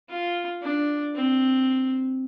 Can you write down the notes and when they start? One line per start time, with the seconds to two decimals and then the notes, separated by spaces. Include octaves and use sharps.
0.09 F4
0.63 D4
1.15 C4